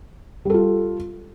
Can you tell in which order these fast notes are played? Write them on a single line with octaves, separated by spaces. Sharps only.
G3 A4 F4